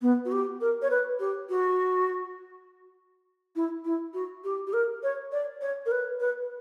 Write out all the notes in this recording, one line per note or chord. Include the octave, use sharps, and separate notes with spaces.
B3
F#4
G4
A#4
C#5
B4
G4
F#4
E4
E4
F#4
G4
G4
A#4
C#5
D5
C#5
A#4
B4
B4